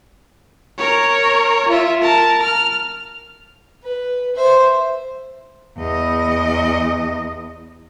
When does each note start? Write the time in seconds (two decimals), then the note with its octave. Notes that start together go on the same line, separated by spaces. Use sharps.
0.78 A#4 C#5
1.69 F4 E5
2.01 A#4 A5
2.43 F6
3.83 B4
4.35 C5 E5
5.77 E2 D#5